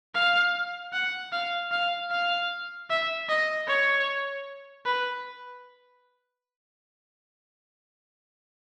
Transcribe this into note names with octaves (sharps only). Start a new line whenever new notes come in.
F5
F#5
F5
F5
F5
E5
D#5
C#5
B4